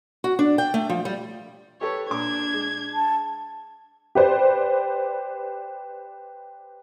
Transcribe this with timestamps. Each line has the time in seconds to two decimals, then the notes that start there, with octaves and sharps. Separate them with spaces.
0.24 F#4
0.39 D4
0.58 G5
0.74 A3
0.90 F3
1.05 G3
1.81 G4 A4 B4 C#5
2.11 A#2 D4 D6 G#6
2.53 G#3
2.94 A5
4.15 G4 B4 C5 D5